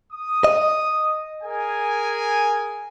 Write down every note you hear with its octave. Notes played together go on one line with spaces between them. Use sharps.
D#6
D#5
G#4 A#4 G#5